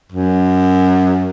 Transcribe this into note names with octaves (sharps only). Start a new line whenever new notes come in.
F#2